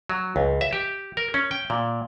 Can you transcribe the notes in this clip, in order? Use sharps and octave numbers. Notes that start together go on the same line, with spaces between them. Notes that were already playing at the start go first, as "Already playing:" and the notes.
F#3
C#2
E5
G4
A#4
C#4
G5
A#2